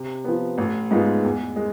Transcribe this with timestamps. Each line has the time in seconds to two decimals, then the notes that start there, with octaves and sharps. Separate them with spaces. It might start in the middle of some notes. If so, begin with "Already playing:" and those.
Already playing: C3
0.24 F3 B3
0.58 A1
0.91 G#2 G#3 B3 F4
1.23 E2
1.56 G#3